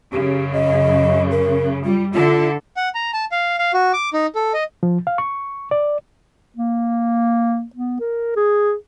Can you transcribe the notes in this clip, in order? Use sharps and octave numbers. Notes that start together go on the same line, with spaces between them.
F#2 C#3 G4
D#5
A#4
G3 F4
D3 E4 F4 A4
F#5
A#5
A5
F5
F5
F#4
D6
D#4
A4
D#5
F3
F5
C#6
D5
A#3
B3
A#4
G#4